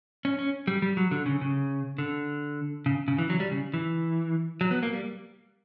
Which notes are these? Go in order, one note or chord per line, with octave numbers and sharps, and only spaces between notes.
C#4
C#4
G3
G3
F#3
D3
C#3
C#3
D3
C#3
C#3
E3
F#3
G3
C#3
E3
F#3
B3
A#3
G3